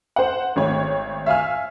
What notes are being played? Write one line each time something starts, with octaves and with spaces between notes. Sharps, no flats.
C5 F#5
G#1 A3 C#5
E5 F5 G#5 F6